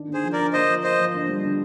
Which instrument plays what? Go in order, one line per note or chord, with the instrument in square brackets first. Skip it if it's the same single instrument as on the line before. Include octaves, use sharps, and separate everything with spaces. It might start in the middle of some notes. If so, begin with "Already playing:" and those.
Already playing: [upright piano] D#3 D4
D3
[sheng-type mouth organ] G#4 C5
[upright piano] F3
[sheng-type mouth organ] A#4 D5
[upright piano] D4
[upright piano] A#3 [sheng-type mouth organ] C5 D#5
[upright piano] F3
[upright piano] A#3 [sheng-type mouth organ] C5 D#5
[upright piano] F3
D3
G3
D3